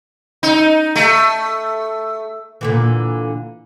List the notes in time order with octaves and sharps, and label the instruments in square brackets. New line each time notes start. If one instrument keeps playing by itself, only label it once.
[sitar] D#4
A3
[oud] A#2 D3 E3